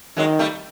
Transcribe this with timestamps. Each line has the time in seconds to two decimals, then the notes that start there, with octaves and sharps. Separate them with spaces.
0.17 D#3 F#3 G#3
0.39 G3 A3